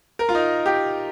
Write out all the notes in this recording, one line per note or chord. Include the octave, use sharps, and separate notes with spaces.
A#4
F4
D#4
G4